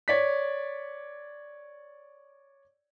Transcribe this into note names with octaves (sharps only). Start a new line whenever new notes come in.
C#5 D5 B6